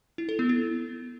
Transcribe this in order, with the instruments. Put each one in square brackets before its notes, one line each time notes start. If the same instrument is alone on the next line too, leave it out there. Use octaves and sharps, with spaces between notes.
[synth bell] E4
A4
B3
E4